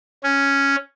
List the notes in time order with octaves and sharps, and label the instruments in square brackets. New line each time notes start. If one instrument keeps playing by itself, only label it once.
[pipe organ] C#4